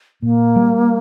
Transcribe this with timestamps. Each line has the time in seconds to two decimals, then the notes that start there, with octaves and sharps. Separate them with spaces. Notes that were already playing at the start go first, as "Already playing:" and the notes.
0.22 A#2 A#3
0.56 G3